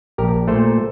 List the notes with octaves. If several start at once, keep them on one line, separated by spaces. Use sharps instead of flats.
A#1 G4 A#4
A#2 A3 A4 C5